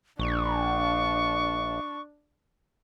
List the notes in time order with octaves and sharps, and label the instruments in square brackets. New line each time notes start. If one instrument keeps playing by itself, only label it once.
[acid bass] A#1 [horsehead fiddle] D4 [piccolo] C#6